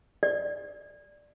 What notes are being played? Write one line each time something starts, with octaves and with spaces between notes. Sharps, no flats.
D5